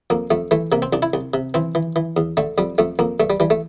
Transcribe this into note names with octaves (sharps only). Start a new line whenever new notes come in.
F2 A#3
F2 A3
E3 A3
C3 A#3
C4
C2 D4
E4
C2
C3
E3 C4
E3
E3
E2
D3 A3
F2 G3
F2 A3
F2 A#3
G2 A3
G3
E3 G3
A3